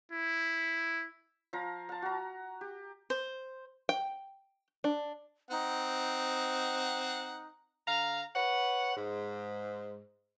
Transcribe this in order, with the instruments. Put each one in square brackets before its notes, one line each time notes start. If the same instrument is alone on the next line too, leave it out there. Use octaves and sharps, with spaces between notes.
[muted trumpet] E4
[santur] F3 F5 A#5
F5 A5
F#4 A#5
G4
[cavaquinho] C5
[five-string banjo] G5
D4
[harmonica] C4 F#5 [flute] D#4
[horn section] D3 F5 A#5
B4 C#5 F#5
G#2